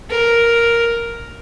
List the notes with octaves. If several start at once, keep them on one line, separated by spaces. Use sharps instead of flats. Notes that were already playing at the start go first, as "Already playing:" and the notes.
A#4